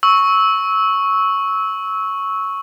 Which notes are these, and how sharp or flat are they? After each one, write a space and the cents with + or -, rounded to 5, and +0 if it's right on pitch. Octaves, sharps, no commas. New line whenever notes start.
C#6 +0 E6 -20